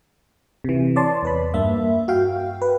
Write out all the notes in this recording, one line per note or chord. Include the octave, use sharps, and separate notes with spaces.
C3 E3
C#5 D5 A5 C6
E2 B4 B5
G2 A#3 E5
F#4 F5 G5
B4